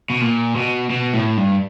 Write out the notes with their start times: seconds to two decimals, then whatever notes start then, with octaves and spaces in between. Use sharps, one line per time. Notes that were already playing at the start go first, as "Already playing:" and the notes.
0.10 B2
0.21 A#2
0.56 B2
0.90 B2
1.14 A2
1.37 G2